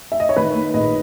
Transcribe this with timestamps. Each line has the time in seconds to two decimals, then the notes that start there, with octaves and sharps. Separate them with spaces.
0.12 E5
0.20 D#5
0.29 C#5
0.36 D#3 B4
0.55 A#3
0.74 A#1 D#5